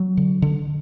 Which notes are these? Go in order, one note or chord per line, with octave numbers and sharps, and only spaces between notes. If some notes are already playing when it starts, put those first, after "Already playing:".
Already playing: F#3
D3
D3